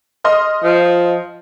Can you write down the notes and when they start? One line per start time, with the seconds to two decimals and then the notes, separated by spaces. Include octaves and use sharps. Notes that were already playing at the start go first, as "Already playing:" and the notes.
0.24 D#5 C6 F6
0.64 F3